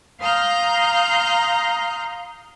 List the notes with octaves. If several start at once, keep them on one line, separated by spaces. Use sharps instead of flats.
F5 A#5 C6 D#6 F6 G6